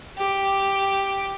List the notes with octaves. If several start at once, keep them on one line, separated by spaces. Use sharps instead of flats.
G4